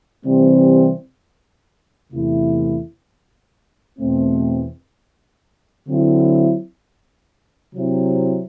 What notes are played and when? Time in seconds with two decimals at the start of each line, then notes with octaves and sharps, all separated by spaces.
0.25 C3 E3 G3 C4
2.12 E2 C3 E3 A3 E4
3.99 E2 B2 A3 C4
5.87 D3 F#3 C4 E4
7.74 C3 F#3 C4 E4